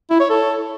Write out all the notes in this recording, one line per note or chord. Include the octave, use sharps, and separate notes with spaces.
E4
C#5
A4